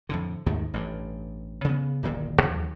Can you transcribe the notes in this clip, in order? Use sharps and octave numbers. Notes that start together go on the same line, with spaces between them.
F2 A2 D3
D#2 G#2 D#3 A3
A1 G2
C#3 B3
D1 G1 A#2 D#3
D#2 E3 F#3